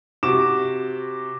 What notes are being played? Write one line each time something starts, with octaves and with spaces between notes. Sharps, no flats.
C3 F#4 D6 E7